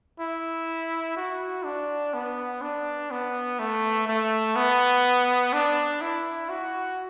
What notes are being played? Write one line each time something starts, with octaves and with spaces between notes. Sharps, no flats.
E4
F#4
D4
B3
D4
B3
A3
A3
B3
D4
E4
F#4